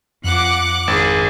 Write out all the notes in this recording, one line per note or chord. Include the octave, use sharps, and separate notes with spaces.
F2 F3 F#5 D6 F#6
G#1 D4 G#4